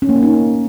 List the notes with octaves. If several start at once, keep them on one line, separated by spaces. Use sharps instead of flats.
C#4
A#3
C#4
D#4